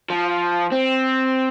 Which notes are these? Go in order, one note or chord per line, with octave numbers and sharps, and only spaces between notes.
F3
C4